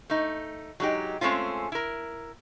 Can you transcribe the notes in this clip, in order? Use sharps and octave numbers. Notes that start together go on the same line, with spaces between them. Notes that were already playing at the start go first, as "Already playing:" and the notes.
A3 D#4
F#3 G#3 D#4 G4
G#3 A3 C4 C#4 F4
E4 A#4